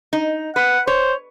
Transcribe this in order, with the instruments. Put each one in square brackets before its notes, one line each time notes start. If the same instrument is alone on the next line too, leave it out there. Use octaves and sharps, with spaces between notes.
[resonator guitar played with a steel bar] D#4
[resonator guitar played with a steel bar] B4 [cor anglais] F#5
[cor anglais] C5 [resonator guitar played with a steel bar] C#5